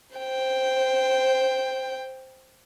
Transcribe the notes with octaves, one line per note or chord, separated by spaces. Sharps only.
C5 G5